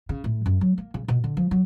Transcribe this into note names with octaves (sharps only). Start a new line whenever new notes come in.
C#3
A2
F#2
F#3
A#3
C#3
B2
D3
F3
F#3